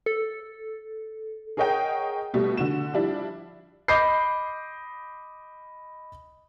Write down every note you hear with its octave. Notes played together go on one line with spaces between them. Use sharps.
A4
G#4 A#4 C#5 D#5 F#5 G5
B2 G3 A3
D3 F#4 E7
F3 G3 D4 E4
D#5 B5 D6 D#6 G6 C7